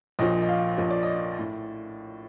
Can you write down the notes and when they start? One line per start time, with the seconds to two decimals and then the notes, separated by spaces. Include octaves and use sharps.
0.19 A#1 A#2 F3 D#5
0.42 D#5
0.49 F5
0.78 A#1 A#2 F3 D#5
0.90 D5
1.03 D#5
1.39 A2